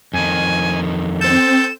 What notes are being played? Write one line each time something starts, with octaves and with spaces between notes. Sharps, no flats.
F2 D#3 G#5
C4 A4 G6 E7